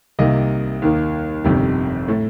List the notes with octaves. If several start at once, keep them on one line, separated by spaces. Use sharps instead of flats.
C2 C3 D#3 A#3 D#5
D#2 D#3 A#3
G1 F2 C3 D#3 G3
A2 A3